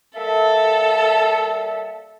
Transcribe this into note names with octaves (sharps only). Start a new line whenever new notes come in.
G3 A#3 A4 E5